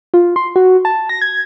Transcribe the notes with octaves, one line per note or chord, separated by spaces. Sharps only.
F4
C6
F#4
A5
A#6
G#6